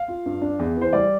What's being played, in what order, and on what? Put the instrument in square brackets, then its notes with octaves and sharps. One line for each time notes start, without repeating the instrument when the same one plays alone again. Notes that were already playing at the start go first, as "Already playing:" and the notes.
Already playing: [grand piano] F5
F4
G2
D4
E2
E3 C5
G3 D5